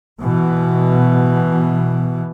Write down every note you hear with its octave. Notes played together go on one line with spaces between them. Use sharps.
B2 E3